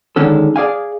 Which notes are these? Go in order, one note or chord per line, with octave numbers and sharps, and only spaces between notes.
D3 D#3 G#3 C#4 A4
G#4 D5 F5 G#5